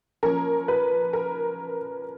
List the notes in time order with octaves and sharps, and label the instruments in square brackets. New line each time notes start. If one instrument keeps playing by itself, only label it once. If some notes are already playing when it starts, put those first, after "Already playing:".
[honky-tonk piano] F3 A#3 C#4 A#4
B4
A#4